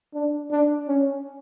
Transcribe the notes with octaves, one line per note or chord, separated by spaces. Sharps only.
D4
D4
C#4